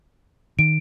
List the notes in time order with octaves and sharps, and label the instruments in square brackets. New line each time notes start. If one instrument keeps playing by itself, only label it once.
[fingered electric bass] D#3 [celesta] D7